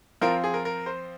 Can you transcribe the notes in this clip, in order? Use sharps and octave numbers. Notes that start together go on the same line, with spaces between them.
F3 C4 F4 A#4
G#4
A#4
A#4
C5